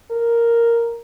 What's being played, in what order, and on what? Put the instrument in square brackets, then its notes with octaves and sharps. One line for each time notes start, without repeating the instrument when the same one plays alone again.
[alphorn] A#4